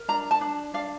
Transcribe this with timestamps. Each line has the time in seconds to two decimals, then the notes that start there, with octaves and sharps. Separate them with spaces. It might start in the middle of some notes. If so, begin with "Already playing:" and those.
Already playing: A#4
0.08 D4 A#5
0.31 A5
0.41 D4
0.74 D4 F5